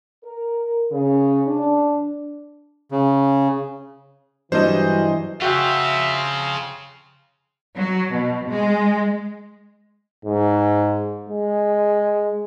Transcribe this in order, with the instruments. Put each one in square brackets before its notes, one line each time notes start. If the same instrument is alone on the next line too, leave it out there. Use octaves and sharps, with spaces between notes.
[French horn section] A#4
C#3
D4
[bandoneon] C#3
[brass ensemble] G2 E3 [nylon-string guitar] F#3 G3 D4 [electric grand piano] C5 D#5
[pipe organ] C#3 [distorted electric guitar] C4 F4 [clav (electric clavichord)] F#4 F#5 G5 [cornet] E5
[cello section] F#3
B2
G#3
[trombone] G#2
G#3